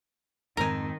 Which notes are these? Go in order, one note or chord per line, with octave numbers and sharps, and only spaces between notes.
F2 G#2 D#3 C4 A#4 G#5